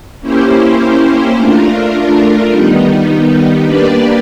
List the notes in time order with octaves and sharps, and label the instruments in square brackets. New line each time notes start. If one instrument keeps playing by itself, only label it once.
[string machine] A#3 C#4 E4 G4 C5
A3 D4 F4 A#4
D#3 G3 B3 D#4
A#3 D4 G4 B4 D5